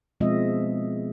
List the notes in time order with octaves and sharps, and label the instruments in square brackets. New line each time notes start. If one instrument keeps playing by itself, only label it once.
[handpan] B2 F3 G#3 C4 D#5 E5